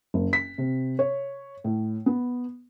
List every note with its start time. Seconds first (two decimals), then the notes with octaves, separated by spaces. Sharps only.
0.14 F#1
0.33 B6
0.58 C3
0.99 C#5
1.64 A2
2.06 B3